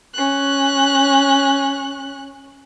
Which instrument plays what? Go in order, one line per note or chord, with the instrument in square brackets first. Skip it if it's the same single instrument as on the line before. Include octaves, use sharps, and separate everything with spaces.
[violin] C#4 F#6